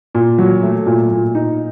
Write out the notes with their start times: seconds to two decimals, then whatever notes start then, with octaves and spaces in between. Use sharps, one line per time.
0.15 A#2
0.38 F#3
0.63 A3
0.86 A#2
1.11 A#2
1.35 D#4